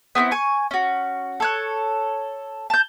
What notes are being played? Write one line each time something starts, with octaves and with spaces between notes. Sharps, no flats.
B3 C4 D4 E4
G#5 C#6
C#4 F#4
A4 C#5 F#6
A5 G6